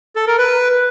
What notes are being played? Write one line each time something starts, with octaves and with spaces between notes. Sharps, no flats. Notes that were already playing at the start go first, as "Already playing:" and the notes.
A4
A#4
B4